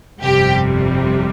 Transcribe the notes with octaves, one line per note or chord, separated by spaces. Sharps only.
G1 F2 C3 G3 G4